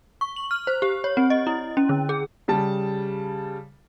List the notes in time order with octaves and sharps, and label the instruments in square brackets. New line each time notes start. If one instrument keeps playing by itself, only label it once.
[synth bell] C#6
F#7
F6
C5
G4
C#5
C4
D#5
E4
C#4
D3
G#4
[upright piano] C#3 G3 A5